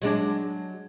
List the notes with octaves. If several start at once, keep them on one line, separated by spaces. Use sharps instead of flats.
F#3 G#3 D4